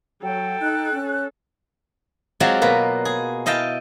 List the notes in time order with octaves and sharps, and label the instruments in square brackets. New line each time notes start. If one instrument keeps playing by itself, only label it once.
[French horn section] F#3 [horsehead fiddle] A4 [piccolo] G5
[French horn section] D#4 [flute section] F#6
[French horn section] C#4
[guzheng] F#3 G#3 C4 F4 D5
B2 A#3 B4
G#4
E4 D#5 F5 G5 A5